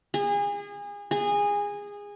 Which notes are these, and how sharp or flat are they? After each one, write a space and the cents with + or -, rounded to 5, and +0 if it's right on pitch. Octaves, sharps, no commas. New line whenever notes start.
G#4 -30
G#4 -20